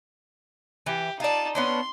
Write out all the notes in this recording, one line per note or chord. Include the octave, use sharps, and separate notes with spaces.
E3 G4
D#4 F4 D5 A5
B3 C#4 D4 C6